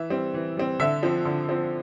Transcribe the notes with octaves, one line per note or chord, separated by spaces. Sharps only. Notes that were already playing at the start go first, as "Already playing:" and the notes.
Already playing: E3 E5
G3 C4
E3
G3 C4
D3 E5
F3 C4
D3
F3 C4